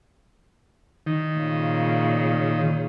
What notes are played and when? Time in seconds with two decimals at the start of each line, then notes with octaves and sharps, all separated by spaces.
1.07 D#3
1.38 A#2 C#3